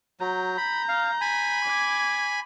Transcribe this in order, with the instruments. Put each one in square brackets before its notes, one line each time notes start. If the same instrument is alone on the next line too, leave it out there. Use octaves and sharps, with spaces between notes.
[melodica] F#3 [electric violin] A#5 G6
[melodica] B5
F5
G#5 B5
[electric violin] D6 G#6